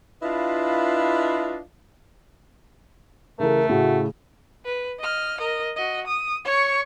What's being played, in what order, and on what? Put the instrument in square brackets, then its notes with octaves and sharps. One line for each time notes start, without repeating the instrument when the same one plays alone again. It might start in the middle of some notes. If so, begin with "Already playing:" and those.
[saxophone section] D4 E4 F4 B4 D#5 F5
[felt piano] C#3 E3 A4 [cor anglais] A3 [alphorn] A#4
[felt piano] A2 C#3 [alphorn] F#4
[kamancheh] B4
D#5 F6
A#4 D#5
F#4 D#5
D#6
C#5 C#6